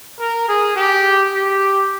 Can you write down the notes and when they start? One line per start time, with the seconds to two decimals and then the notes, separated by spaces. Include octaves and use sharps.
0.20 A#4
0.48 G#4
0.76 G4
1.33 G4